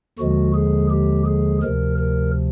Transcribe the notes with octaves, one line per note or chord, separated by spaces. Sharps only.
D#2 D3 F3 G#3 F#4
G#4
G4
G#4
D2 C3 F3 A#4
A#4